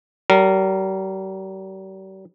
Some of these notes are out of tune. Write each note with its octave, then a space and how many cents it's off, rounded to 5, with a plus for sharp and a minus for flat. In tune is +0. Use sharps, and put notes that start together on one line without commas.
G3 -45 A#4 -20